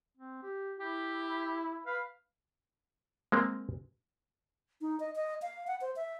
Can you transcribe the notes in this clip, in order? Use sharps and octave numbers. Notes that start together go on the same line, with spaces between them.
C4
G4
E4 G4
B4 F5
G#3 A#3 C4
D#4
D#5
D#5
F5
F#5
C5
E5